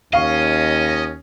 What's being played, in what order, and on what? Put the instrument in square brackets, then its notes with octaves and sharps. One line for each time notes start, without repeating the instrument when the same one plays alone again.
[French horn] D#2 [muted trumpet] C#4 [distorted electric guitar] D#5 [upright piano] F5 C#6